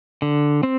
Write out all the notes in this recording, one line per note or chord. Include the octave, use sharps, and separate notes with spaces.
D3
C4